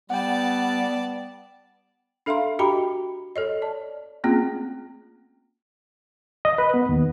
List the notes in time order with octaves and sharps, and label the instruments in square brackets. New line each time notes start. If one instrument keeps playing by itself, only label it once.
[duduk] G3 [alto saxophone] B3 [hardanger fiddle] D5 A5 [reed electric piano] F#5 G5
[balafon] D4 A4 E5 F5 A#5 C6
F#4 G4 D#5 G5 A#5 B5
A4 C#5 D#5
D5 A5
A3 A#3 C4 C#4 F4 G#4
[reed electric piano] D#5
B4
B3
D#2